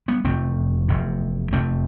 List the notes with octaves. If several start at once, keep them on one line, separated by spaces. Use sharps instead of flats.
G3 B3
F1 E2 C3 A3 C4
F1 E2 C3
F1 E2 C3 A3 C4